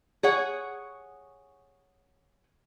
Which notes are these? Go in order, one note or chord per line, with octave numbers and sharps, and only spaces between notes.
G#4 C#5 F#5